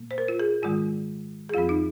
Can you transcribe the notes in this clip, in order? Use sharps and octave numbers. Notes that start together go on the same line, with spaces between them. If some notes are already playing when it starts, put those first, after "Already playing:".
Already playing: A#2 A#3
C5
A#4
F4
G#4
G#2 D#3 G#3 F4
G#4
F2 F3 C4 F4
D#4